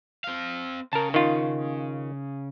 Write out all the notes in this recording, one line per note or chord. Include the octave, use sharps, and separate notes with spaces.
C4 F5
C#3 A#4 A5
D#3 F4